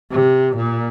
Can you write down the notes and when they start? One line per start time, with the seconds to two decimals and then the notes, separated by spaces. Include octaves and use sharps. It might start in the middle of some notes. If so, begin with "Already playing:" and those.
0.11 C3
0.56 A#2